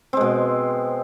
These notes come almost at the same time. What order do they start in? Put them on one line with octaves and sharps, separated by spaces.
C4 G#3 B2